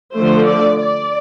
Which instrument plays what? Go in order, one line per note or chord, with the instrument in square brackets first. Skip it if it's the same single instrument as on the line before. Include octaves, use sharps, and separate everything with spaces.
[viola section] D3 F3 A3 C5
D5
D5